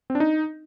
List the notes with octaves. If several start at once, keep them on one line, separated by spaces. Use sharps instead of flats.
C4
D4
D#4